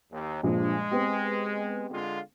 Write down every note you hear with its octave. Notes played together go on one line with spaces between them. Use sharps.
D#2
G2 A#2 F3 G#3
B3 C4 G4
D3 G#3 F4